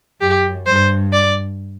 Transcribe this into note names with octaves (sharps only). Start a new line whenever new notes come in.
F#2 G4
G2 C5
D5